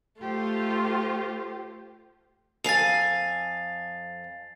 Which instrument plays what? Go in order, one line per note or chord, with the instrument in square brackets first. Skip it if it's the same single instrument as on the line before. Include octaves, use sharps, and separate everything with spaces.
[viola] A3 F4 [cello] G4 C5
[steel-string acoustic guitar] F2 F5 G#5 [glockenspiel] A6 C7 F7